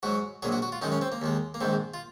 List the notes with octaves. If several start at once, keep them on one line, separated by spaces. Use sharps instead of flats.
G#2 F#3 F#4
A#1 A#2 F#3 G#4
F#4
F#4
F4
F#2 D#3 G#3 D#4
C#4
C4
A#3
D#2 D#3 G#3
A#3
A#1 G#2 D#3 C4
F4